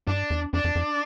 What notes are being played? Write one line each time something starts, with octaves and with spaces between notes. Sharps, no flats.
G2 D4
E2
F2 D4
F2
F2